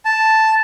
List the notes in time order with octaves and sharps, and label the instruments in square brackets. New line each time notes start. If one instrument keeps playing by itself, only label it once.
[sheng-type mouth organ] A5